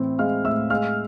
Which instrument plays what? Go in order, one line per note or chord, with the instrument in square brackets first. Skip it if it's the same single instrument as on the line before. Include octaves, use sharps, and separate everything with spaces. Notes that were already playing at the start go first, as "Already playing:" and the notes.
Already playing: [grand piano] A2 E3 C4
G#3 F5 F6
A2 E5 E6
G#3 F5 F6